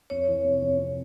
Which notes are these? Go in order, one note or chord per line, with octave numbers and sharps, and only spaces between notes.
F2 C#5
E3
C3
F2
C3